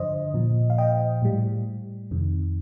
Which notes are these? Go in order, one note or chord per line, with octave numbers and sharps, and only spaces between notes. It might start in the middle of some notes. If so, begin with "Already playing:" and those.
Already playing: G2 D3 F3 C5 D#5
A#2 F3
F5
D#5 G5
A2 G3
F2 C3 D#3